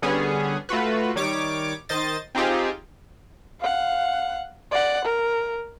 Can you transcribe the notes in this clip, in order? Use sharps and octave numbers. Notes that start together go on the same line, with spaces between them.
D3 G3 B3 C#4 G#4
A3 F4 F#4 B4
D#3 G3 C#5 D6
D#3 C5 D#5 A6
C4 D#4 F4 G4 G#4
F5 F#5
D5 F#5
A#4